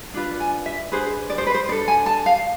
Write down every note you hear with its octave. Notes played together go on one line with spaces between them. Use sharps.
D4 F4 B4
G#5
E5
D4 G#4 B4 C5
D5
C5
B4
C5
D4 A4 D5
G#5
A5
F5